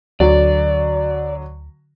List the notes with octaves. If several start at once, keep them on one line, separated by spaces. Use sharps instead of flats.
D2 D3 F#3 D5